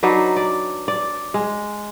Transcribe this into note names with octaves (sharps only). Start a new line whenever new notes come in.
F#3 D4 D#4 B4
D5
D5
G#3